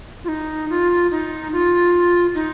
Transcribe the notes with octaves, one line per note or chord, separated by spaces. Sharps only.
F4
D#4
F4
D#4
F4
D#4